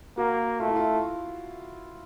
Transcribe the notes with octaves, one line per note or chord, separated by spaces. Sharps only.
A#3 F#4
A3 F4
E4
F4